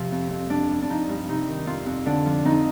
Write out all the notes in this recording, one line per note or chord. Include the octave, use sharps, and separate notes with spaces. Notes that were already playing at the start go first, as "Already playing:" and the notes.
Already playing: C3 F3
F2
F2
F3 D4
G2
D4
F3 D#4
G2
C3 D#4
D#3
F2 F4
F2
D3 D4
F3
F2 D#4